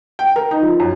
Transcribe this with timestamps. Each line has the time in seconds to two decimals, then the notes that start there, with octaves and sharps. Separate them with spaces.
0.19 G5
0.36 A#4
0.51 D#4
0.62 F3
0.80 F#2